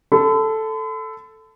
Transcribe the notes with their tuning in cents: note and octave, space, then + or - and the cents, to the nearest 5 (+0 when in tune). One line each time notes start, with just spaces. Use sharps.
A4 +0 B5 +45